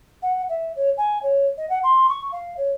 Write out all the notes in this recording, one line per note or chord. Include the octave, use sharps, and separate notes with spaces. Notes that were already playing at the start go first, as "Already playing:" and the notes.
F#5
E5
C#5
G#5
C#5
D#5
F#5
C6
C#6
F5
C#5